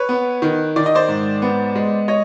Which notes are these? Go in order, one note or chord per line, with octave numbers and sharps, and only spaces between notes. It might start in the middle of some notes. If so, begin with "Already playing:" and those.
Already playing: B4 C#5
B3
D#3
D#3 D5
D#5
C5 D5
G#2
B3
G#3
C#5 D#5